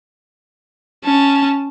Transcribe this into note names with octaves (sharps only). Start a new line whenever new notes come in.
C#4 A5